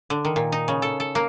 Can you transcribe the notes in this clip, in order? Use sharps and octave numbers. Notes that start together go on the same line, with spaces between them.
D3
D#3
A#2
D#4
C#3
A4
A4
A#3